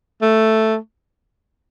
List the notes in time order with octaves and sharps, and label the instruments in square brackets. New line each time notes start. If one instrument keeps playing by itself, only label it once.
[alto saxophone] A3